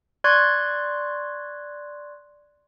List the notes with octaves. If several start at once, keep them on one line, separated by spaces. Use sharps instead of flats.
D5 C6 C#6 F#6 G#6